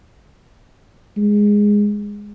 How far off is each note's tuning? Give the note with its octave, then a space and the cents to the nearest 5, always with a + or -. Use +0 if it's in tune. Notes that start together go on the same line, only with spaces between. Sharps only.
G#3 -10